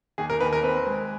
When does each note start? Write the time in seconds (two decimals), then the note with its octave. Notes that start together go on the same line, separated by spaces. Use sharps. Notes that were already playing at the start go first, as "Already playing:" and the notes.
0.18 D#2 G#4
0.30 A#4
0.40 D#2 B4
0.53 A#4
0.63 C4 B4
0.86 G#3